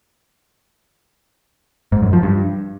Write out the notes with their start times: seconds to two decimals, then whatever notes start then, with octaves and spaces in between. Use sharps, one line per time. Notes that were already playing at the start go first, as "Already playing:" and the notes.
1.92 G#2
2.03 F#2
2.13 F3
2.23 G2